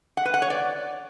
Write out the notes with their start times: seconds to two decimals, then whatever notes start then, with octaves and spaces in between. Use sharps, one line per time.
0.17 F#5
0.25 B4
0.34 F#5
0.42 C#5
0.50 D5